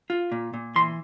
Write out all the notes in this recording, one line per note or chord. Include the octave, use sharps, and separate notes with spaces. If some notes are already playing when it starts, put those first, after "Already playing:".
F4
A#2
A#2
E3 C6